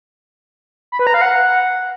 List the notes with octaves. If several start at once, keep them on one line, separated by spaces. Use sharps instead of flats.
B5
B4
A#5
F5
F#5